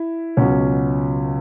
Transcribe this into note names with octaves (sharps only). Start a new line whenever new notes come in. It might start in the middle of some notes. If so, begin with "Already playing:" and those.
Already playing: E4
C#2 B2 F#3 C#4